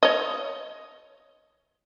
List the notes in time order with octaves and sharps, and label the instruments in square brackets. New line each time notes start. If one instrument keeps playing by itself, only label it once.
[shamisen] C#5 D#5